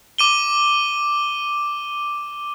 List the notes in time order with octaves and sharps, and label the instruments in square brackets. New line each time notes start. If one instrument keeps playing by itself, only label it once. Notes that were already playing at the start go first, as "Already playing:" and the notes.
[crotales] D6 D#7 G7